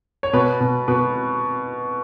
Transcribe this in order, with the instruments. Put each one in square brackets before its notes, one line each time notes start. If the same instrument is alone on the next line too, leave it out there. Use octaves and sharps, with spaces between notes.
[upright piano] C#5
B2 B4
B2
B2 B4